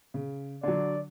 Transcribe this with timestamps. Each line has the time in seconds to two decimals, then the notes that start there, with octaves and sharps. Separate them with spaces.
0.14 C#3
0.63 D3 F#3 D5